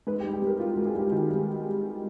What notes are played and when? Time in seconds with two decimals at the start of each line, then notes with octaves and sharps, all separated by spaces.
0.07 G#2 B4
0.20 G4
0.24 G3
0.33 G4
0.42 G3
0.47 A#4
0.60 G3 F4
0.73 F#4
0.77 G#2
0.85 G#4
0.95 G3 G4
1.12 D#3 F#4
1.30 G3